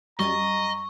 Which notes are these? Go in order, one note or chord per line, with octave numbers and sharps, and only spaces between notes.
F#2 G3 D#5 A#5 C#6 A6